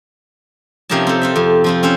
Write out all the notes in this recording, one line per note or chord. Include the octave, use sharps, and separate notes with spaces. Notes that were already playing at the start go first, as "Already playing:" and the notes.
C3 F3 A#3 C#4 D#4 A5
C4 A4
F4 A4 E5
F2
F3 C4 F4
C4 C#4 A4 C5